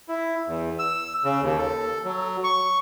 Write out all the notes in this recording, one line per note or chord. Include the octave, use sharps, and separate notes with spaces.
E4
E2
E6
C#3
D#2
A4
F#3
C#6